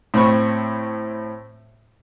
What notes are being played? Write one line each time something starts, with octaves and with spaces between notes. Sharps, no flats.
A2 C4 B5 C#6